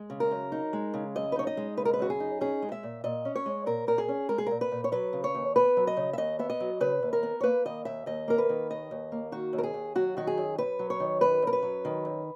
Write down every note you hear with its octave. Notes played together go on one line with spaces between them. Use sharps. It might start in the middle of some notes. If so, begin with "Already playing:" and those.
Already playing: G#3
C#3
A#4
F#2
D#4
G#3
C#3
F#2 D#5
B4
D#4 C#5
D#5
G#3
C#3 B4
A#4
B4
F#2 F#4
G#4
D#4
C#4 G#4
G#3
E5
A#2
A#2 D#5
C#4
C#5
G#3
A#2 A#4
A#2 A#4
G#4
C#4
G#3 A#4
G#4
A#2 A#4
B4
A#2
C#5
F#3 B4
C#3
C#5
D#2
B3 B4
F#3
D#5
C#3
E5
D#2 D#5
B3 E5
D#5
F#3
C#3 B4
D#2
A#4
B3
C#5
A#3 B4
D#3 D#5
D#2 E5
D#2 D#5
A#3 A#4
B4
D#3
D#2 D#5
D#2
A#3
D#3 F#4
D#2
A#4
G#4
D#2
F#3 F#4
D#3 F#4
G#4
F#2
F#2 B4
F#3
C#5
D#3
F#2 B4
F#2 A#4
B4
F#3
D#3
F#2